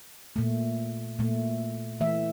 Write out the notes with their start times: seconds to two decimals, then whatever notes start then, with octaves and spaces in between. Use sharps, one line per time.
0.36 A#2 A3
1.19 A#2 A3
2.00 E3 A3 E5